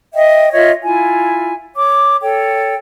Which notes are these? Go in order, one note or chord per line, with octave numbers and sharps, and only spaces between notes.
D#5 E5 G5
F4 C#5 D#5 E5
E4 F4 G#5
C#5 D6
A4 C#5 G5